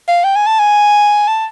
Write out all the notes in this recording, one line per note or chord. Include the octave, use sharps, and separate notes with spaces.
F5
G5
G#5
A5
G#5
A5